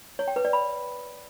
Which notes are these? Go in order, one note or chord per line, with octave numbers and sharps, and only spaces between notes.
C#5
G5
B4
D5
B5